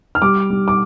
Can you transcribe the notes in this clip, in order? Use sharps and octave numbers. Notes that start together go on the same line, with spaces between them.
F6
G3 D6
G3
D6